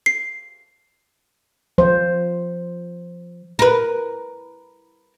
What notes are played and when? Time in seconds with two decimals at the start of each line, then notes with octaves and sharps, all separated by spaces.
0.06 C7
1.78 F3 C5
3.59 A#4 B4